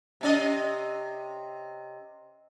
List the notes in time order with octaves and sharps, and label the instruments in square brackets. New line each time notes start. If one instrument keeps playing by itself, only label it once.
[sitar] C3 C#4 D#5